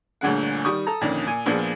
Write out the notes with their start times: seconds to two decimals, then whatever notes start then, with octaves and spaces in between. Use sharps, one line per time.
0.21 G1 D2 A#2 D3 G#4 F#5
0.65 D#3 G3 C#6 D#6
0.87 A4 A#5
1.01 F2 A#2 D3 D#3 C#4 D4
1.27 A#2 G#5
1.46 A#1 A#2 F3 B3 D4 G#4